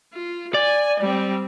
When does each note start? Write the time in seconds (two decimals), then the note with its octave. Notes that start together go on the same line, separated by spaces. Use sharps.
0.14 F4
0.54 D5 G#5
1.00 G3 C4